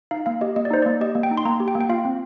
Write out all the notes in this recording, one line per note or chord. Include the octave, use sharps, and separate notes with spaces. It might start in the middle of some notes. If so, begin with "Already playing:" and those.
D#4 F5
A#3 F5
G4 D#5
A#3 D#5
D5
D#4 C5
A#3 D5
G4 D#5
A#3
G5
D#4
C6
A#3 A#5
G4
G5
A#3
G5
F4 F5
C4